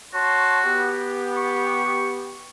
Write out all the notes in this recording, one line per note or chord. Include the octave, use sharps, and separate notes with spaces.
F#4 C#5 A5 C6
B3 G4
C#6